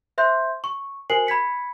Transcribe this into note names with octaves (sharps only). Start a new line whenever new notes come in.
C5 E5 C6 G6
C#6
F#4 A#4 C5 G#5 C7 F#7
B5 G#6 B6 C#7